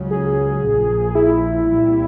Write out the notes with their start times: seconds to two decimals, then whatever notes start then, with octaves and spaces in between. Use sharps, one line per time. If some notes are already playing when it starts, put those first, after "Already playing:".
Already playing: C#2 C#3 F#3
0.11 G#4
0.64 A#1 A#2 F3
1.15 E4
1.67 C2 A#2 G3